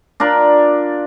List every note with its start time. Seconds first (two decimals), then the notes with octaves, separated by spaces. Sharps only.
0.20 D4 F4 A#4 D5